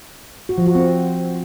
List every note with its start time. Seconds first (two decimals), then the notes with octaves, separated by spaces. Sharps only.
0.49 F#4
0.58 F3
0.66 F#4
0.75 C4